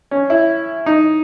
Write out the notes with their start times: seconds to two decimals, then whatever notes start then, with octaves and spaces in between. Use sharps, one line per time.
0.11 C#4
0.30 E4
0.86 D#4